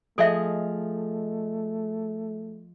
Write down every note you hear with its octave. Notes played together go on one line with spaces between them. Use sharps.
F3 A3 G#4 A4 D#5 E5